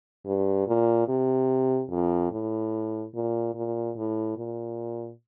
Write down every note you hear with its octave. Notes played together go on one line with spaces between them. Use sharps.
G2
A#2
C3
F2
A2
A#2
A#2
A2
A#2